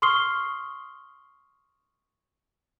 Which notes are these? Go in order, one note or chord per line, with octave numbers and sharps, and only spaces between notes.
C6 C#6 D#6 F6 C7 G7